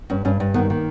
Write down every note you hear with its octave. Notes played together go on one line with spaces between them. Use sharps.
G2 C#4
G2 C#4
G2
D#3 B3
D#3 A#3